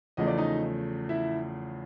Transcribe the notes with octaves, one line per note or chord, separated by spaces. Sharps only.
E2 C#3 F3 A3 D#5
D5
D#4 D#5
E4 E5